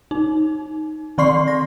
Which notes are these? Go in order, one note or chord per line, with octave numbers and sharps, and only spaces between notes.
D#4
D#3 C4 D5 C6 C#6 C7
A#6